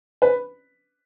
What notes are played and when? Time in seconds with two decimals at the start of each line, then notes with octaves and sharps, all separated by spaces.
0.22 B4